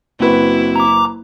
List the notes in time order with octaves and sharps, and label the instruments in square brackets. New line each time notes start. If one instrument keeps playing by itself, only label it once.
[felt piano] F#1 B4 [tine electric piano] C4 F#4 [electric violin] E4
[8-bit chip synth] A#5 D6